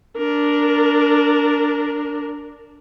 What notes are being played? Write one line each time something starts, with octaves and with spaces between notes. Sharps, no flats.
D4 A#4